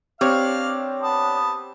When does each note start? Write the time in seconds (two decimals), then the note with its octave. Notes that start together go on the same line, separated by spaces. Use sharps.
0.21 C4 D4 G4 C#5 F5 F6
1.02 B3 A5 D#6